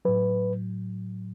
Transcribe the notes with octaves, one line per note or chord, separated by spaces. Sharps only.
A2 F#3 B4